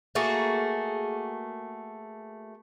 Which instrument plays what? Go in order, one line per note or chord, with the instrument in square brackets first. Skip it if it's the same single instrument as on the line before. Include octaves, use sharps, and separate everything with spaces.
[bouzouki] A3 A#3 F#4 G#4